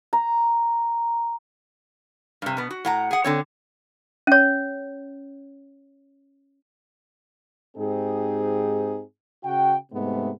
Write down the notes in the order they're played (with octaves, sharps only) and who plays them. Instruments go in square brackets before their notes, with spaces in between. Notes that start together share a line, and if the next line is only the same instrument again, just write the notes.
[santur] A#5
[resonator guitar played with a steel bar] G2 C3
B2 B3
F#4
A2 F#5 A#5
G#4 F#5
D3 C4 C#5
[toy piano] C#4 C#5
[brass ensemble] G#2 C4 D#4 G4 G#4
C#3 F#4 G5
G#2 C3 G#3 A3 B3